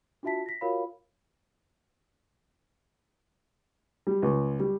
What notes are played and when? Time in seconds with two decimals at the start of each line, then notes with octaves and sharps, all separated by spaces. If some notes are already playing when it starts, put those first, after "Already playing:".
0.23 D4 F4 F#4 E5 A5 B6
0.46 A#6 B6
0.61 F4 F#4 A#4 C#5 F5 B5
4.07 G3
4.22 C#2
4.60 G3